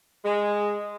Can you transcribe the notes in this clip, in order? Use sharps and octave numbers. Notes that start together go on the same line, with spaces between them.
G#3